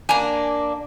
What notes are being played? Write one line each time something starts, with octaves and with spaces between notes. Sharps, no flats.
A#3 D4 G#5 A#5